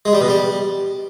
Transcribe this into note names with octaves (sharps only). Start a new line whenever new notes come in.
G#3
G3
B2
G3